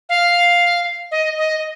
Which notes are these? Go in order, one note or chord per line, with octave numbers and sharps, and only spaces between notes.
F5
D#5
D#5